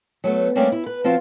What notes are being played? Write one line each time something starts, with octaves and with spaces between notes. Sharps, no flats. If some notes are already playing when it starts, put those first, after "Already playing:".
F#3 A3 B3
G3 A3 A#3 C4 C#4 D5
E4
B4
F3 C4 F4 F#4